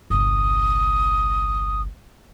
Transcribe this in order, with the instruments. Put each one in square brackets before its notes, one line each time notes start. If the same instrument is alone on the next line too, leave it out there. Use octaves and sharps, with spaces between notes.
[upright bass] G1 C2 [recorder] D#6